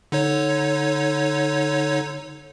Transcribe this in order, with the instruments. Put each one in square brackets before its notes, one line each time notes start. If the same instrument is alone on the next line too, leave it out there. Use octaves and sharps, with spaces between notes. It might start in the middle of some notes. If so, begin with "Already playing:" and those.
[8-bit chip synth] D3 D#4 C#5